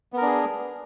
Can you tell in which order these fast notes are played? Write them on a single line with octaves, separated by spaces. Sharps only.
B3 A#4 D4 G#4